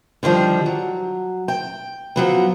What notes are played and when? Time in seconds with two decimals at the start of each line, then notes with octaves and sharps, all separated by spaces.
0.23 D3 D#3 F3 G3
0.66 F#3
1.48 G5
2.16 F3 F#3 B3